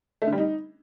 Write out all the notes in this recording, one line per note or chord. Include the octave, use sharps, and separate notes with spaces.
A3
D3
G3
D#4